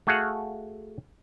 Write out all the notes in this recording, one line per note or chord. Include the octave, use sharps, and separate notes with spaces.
A3 F#4 G#4 F5 F#5